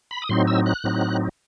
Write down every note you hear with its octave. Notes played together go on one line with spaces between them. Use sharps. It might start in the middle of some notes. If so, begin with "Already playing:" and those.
B5
D#6
A2 F#3 C4 D#4 C6
E6
F#6
A2 F#3 C4 D#4